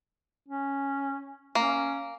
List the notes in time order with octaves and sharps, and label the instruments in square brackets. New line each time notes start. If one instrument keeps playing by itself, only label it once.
[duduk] C#4
[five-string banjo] A#3 [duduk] C#4